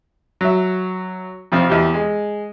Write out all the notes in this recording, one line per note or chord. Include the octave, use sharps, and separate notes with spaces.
F#3 E5
F2 C3 F3 C4
E2 G4
G#3